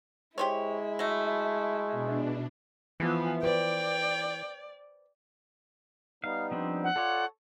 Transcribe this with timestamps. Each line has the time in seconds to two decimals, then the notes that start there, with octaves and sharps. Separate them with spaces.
0.38 G#3 E4 G4 C5 C#5
0.99 F#3 A3
1.92 B2 D4
3.00 E3 F3 B3
3.43 B4 C5 D5 G5
6.24 G3 B3 D#4 F5
6.51 F3 C4 D4
6.84 F#5
6.96 F4 A4 C#5 D5